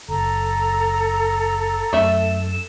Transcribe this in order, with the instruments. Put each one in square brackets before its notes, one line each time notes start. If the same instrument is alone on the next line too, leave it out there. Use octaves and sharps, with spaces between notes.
[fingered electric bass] F#1 [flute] A4 [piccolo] A#5
[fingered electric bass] F#2 [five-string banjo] A3 E5 [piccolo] E7